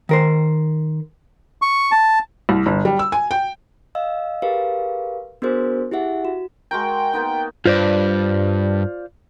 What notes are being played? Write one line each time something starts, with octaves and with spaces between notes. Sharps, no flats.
D#3 A#4 C5
C#6
A5
C2
G1
G3
E6
G#5
G5
D#5 F5 E6
G4 G#4 A#4 B4 F5
B3 D4 F#4 G#4 A#4 C5
E4 G4 G#4 E5 F#5
F#4
G#3 F#4 A#4 G5
A#3 B3 D#4
G2 F4 C5 D5